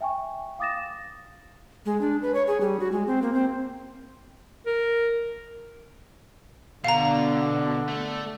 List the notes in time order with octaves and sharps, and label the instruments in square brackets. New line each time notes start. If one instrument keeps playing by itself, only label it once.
[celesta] E5 G5 G#5 C#6
F5 D6 D#6 A6 A#6 E7
[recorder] G#3
D4
B4
C#5
G#4
G3
F#4
G#3
C4
A#3
C4
[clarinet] A#4
[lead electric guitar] B2 [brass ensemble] D3 [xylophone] F5 A#5
[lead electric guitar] A3